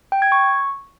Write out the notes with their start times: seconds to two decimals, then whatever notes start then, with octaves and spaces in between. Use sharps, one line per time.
0.12 G5
0.22 G#6
0.32 C#6